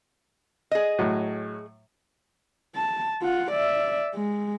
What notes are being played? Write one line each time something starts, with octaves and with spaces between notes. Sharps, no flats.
G#4 D#5
A2 F#3
A5
F4 F#5
D5 E5
G#3